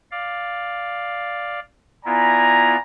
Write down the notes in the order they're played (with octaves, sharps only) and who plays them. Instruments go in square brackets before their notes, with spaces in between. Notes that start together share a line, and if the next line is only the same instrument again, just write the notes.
[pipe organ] D5 F5
[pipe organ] B3 E4 F4 [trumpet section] D5 G#5 A#5